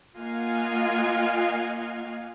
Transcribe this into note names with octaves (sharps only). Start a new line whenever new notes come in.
A#3 F4 D#5 F5 F#5 G#5